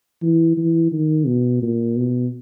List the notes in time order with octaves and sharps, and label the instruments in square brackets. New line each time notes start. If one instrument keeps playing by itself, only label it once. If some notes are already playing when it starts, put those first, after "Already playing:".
[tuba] E3
E3
D#3
B2
A#2
B2